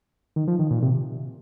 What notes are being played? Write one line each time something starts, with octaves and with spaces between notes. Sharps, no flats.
D#3
F3
D#3
A#2
C3